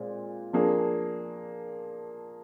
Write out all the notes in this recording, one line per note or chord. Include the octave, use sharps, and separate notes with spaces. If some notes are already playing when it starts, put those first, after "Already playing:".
Already playing: A#2 G#3 C4
F3 A#3 D4 G#4